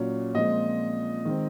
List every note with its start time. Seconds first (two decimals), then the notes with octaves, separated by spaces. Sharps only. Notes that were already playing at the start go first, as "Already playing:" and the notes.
Already playing: A#2 F#3 C#4
0.34 A#2 F3 G#3 C4 D#5
1.25 D#3 G#3 C4